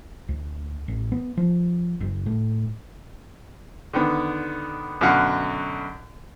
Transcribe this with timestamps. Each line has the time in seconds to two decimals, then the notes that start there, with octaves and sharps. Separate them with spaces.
0.29 D2
0.88 A1
1.12 B3
1.37 F3
2.01 F#1
2.26 A2
3.93 D3 D#3 B3
5.01 F#2 B2 D3 F#4 F5 F#5